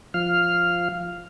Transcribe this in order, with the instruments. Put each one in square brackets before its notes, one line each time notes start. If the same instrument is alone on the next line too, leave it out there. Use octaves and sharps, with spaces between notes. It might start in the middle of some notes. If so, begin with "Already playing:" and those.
[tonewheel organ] F3 F5 F6